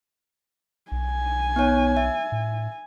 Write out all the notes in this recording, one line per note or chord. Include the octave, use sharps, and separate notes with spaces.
B1 G#5
B3 D#4 C#5
E5
A2